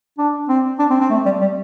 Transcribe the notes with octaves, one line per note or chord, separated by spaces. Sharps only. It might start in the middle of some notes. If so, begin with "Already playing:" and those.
D4
C4
D4
C4
C4
A3
G3
G3